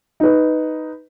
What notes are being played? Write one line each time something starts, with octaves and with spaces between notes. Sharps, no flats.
D#4 B4